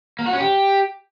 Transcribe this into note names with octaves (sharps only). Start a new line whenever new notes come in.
A#3
F#4
C#4
G4